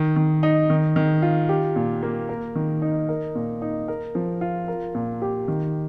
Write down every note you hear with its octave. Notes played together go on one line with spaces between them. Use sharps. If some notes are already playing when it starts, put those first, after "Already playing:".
Already playing: D#3
D#3
D#4
D#3
D#3
F4
G4
A#2
A#3
A#4
D#3
D#4
A#4
A#2
D#4
A#4
F3
F4
A#4
A#2
G4
D#3